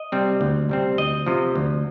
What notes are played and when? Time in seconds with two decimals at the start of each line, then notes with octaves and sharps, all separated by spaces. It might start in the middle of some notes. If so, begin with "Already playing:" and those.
Already playing: D#5
0.12 C3 G3 C4
0.41 D2
0.69 C3 G3 C4
0.98 D2 D#5
1.26 C3 F3
1.56 D2